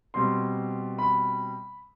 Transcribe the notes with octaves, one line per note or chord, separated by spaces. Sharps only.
B2 G3 C4 C6
B5